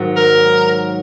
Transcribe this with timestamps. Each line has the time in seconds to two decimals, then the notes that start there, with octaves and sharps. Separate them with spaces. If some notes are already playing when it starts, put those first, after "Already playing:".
Already playing: G#2 D#3 F#3
0.16 A#4